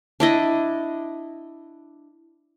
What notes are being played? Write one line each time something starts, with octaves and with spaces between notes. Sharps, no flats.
D4 E4 D#5